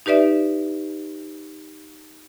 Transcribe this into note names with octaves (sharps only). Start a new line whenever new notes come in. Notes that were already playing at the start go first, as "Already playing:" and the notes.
D#4 G4 B4 D5 E5